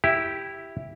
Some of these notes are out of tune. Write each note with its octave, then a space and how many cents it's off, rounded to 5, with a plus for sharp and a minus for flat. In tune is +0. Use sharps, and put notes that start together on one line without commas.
E4 +0 G4 +0